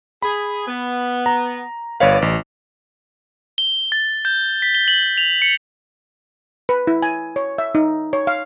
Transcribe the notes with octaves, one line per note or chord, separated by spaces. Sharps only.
G#4 B5
B3
A#5
G1 B4 C#5 D5 F5
A1
G7
A6
G6
B6
G7
F#7
F7
C#7
B4
E4
G#5
C#5
E5
D#4
C#5
F5